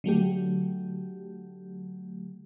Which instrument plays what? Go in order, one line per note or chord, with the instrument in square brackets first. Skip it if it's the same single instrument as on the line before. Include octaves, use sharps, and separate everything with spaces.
[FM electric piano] D3 F#3 A3 G4